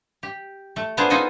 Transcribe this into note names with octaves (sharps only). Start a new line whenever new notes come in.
G4
A3
A#3 B3 D4 F4 G#4 C5
D#4 F4 A4 D#5 G#5